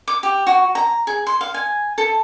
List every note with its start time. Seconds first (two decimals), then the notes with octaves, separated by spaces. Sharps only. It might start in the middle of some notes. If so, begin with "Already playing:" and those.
0.08 D6
0.23 G4
0.47 F#4
0.75 A#5
1.07 G#4
1.27 C6
1.41 F5
1.54 G#5
1.98 A4